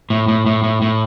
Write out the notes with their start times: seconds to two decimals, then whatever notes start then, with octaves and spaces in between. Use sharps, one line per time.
0.10 A2
0.28 A2
0.46 A2
0.64 A2
0.82 A2